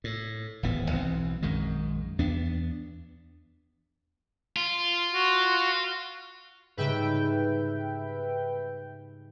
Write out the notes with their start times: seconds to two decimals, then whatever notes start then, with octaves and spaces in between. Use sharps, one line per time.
0.04 A2
0.63 D1 G#1 E3 B3
0.91 B1 E3 G#3 C4
1.42 A#1 F#2 D#3 G#3
2.19 E2 B3 D4
4.56 F4
5.13 F#4
6.77 G#2 C#3 G3 B4 E5 G5